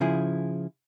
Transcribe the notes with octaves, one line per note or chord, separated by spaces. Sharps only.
C#3 F3 E4 G#4